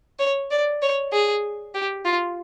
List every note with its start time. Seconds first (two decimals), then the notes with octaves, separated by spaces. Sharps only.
0.19 C#5
0.51 D5
0.82 C#5
1.12 G#4
1.75 G4
2.05 F4